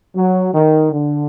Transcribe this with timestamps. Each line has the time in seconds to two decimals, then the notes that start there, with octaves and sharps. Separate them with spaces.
0.16 F#3
0.54 D#3
0.92 D3